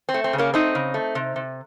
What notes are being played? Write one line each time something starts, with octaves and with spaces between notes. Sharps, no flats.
C4
A3
C4
C#3
A#3 C#4
A3 C4 D#4
C#3
A3
C3
C3